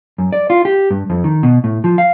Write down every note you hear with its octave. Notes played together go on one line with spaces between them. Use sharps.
F#2
D5
F4
G4
G2
F2
D#3
B2
A2
F3
F5